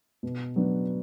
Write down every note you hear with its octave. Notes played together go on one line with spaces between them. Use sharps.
B2
F#3 B3 D4